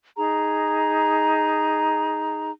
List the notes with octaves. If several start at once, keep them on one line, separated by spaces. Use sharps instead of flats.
D#4 G#4 A#5